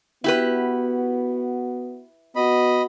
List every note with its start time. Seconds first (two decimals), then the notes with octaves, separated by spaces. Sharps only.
0.24 B3 E4 F#4 G4 B4
2.36 B3 F#4 D#5 B5